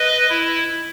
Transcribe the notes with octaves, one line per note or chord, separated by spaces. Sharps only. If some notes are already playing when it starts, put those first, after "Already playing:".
Already playing: B4 D#5
E4